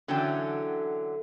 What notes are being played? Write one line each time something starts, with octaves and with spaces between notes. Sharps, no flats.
D3 E3 F#3 C#4 A4 G5